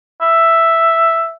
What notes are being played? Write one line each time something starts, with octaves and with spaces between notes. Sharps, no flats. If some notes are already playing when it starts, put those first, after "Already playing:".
E5